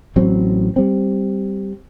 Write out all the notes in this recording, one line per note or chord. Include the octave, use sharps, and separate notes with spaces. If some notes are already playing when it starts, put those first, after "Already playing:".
A1 F#3 C4
G3 C4